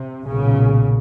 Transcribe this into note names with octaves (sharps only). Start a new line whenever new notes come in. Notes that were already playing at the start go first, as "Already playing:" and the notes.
Already playing: C3
B1 A#2 C#3